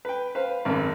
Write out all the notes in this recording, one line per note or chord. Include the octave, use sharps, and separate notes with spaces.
B4 G5
B4 C5 F5
G#1 F#2